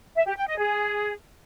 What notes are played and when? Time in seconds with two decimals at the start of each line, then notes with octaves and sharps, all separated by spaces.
0.15 E5
0.26 G4
0.37 G5
0.47 D#5
0.58 G#4